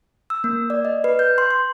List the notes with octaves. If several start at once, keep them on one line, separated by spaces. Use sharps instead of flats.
E6
A#3
D5
D#5
B4
G6
C6
C6